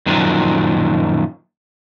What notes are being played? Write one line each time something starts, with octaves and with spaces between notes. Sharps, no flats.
F#2 A#2 D#3 F3 F#3 D4